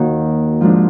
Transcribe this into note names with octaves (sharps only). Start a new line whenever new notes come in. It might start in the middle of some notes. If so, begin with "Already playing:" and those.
Already playing: D#2 D#3 A#3 D#4 F#4
G#2 F3 G#3 D4 F4